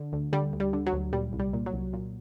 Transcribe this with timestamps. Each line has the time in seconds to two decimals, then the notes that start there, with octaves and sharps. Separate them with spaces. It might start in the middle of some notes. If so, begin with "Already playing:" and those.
Already playing: D3
0.13 D2
0.33 D3 G3
0.53 D2
0.60 G3
0.73 D3
0.86 F#3
0.93 D2
1.13 A#2 G3
1.33 C2
1.39 G3
1.53 A#2
1.66 F#3
1.74 C2
1.93 A#2